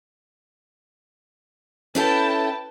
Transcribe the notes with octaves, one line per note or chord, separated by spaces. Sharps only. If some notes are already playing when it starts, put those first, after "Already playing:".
C#4 E4 A4 B4 G5 A5